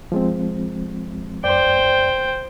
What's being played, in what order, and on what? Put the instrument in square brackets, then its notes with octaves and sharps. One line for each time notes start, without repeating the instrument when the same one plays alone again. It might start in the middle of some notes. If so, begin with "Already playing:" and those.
[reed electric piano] F3 G#3 C4
[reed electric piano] F#2 D5 [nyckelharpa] C5 G5